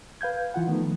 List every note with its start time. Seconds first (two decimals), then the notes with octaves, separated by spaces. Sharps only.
0.21 B4 F5 G6 G#6
0.54 E3 F4 F#5
0.67 D#3 F3 A3 B3 D#4